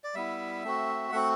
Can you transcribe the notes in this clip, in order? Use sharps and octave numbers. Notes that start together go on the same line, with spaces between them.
D5
G3 B3 E4 E5
A3 C4 F#4
A3 C4 F#4 F#5